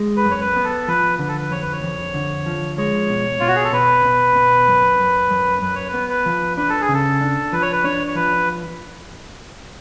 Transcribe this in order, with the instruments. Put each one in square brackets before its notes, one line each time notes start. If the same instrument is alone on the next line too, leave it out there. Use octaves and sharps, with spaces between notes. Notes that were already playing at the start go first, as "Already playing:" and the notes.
Already playing: [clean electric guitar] G#3
[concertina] B4
[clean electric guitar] F#2
[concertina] C#5
B4
[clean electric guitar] B3
[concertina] A4
[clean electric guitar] F3 [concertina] B4
[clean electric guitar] D3 [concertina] B4
[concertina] A4
B4
[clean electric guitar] F2 [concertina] C#5
[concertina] B4
C#5
[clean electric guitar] F2
D3
F3
[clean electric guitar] G#3 [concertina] C#5
[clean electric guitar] B2
[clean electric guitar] B2 [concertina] F4
[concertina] F#4
G#4
A4
[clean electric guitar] B2 [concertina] B4
[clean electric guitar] B2
B2
F#2
F#2
F#2
[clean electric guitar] F#2 [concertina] B4
[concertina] C#5
B4
[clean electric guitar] B3
[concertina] B4
[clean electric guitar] F3
[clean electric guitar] D4 [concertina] B4
[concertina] A4
G#4
[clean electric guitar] C#3
[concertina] A4
[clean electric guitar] D4
[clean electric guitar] F3 [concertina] B4
[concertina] C#5
B4
[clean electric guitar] D4 [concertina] C#5
[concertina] C#5
[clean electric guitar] F3 [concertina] B4